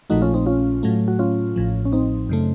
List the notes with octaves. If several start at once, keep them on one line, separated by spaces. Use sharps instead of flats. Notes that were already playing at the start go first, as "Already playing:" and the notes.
A#1 A#2 F3 A3 D#4 F#4
C#4 F4
C4 D#4
C#4 F4
A2 F#3 A3
F#4
C#4 F4
A1 A2 F3
C#4
C4 D#4
F#2 C#3 A3